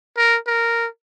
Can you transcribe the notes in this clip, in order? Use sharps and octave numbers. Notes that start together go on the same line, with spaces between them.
A#4
A#4